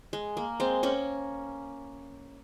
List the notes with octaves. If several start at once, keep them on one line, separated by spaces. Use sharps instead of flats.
G#3
A#3
G#3 C4
A#3 C#4